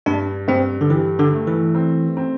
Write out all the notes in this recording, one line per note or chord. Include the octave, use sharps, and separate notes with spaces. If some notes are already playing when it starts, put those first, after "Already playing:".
G2 D4
G2 C4
D3
E3 G4
D3
A3
E3
C4
C4